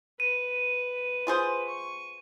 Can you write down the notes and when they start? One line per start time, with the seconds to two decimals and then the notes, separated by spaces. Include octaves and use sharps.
0.20 B4 D#7
1.27 F4 G#4 C5
1.67 C#6